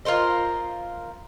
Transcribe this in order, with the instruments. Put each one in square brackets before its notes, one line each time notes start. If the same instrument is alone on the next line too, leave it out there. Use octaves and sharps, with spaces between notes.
[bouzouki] F4 A#4 C5 D#5